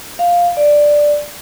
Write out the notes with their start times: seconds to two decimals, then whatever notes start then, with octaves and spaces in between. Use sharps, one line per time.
0.19 F5
0.57 D5